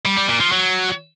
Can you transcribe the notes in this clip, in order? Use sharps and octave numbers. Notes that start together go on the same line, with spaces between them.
G3
G3
A#2
F3
F#3